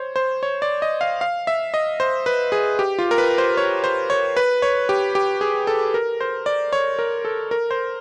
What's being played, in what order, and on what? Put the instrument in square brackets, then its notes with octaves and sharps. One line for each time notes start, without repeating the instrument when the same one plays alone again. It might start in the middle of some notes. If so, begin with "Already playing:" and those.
Already playing: [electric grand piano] C5 C#5
C5
C#5
D5
D#5
F5
F5
E5
D#5
C5
B4
G#4
G4
F4
A#4
B4
C5
C#5
C5
C#5
B4
C#5
G4
G4
G#4
A4
A#4
C5
D5
C#5
A#4
A4
A#4
C5